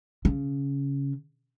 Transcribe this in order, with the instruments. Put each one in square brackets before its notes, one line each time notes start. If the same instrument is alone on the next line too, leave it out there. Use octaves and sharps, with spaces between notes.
[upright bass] C#3